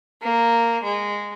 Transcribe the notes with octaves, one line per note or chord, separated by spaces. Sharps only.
A#3
G#3